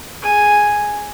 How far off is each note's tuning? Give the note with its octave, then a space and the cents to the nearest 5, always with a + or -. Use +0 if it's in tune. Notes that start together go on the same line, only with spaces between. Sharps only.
G#4 +0 G#5 +0